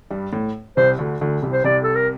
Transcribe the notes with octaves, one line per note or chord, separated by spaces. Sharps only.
G2 G3
A2
C2 C3 C5
D2 D3
D2 D3
C2 C3
C5
C2 C3 D5
A4
A#4